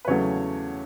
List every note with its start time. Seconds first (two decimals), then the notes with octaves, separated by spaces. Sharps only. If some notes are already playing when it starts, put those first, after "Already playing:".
0.05 B4
0.08 E2 C#3 F#3 A3 C#5